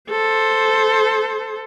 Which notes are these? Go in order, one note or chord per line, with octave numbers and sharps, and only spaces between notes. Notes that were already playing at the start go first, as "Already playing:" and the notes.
A4 C5